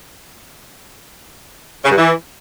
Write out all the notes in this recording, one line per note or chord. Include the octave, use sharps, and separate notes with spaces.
C#3
G2
E3